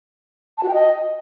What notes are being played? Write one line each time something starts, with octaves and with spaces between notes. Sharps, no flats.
A5
F#4
G5
D#5